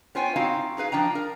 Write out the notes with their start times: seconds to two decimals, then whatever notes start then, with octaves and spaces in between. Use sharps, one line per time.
0.15 B3 F4 C5 C#5 G5 G#5
0.36 C4 D#4 E4 F#4 F5 G5
0.77 D#4 G#4 B4 F5
0.92 F3 D4 G5 A#5
1.15 A#4